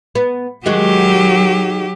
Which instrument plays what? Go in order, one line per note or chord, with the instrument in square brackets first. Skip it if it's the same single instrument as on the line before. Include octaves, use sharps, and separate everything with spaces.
[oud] B3
[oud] D#3 G#3 F#4 [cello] F#3 G4